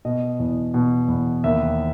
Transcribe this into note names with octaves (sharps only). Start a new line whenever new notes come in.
B2 D#5
E2
B2
E2
D#2 E5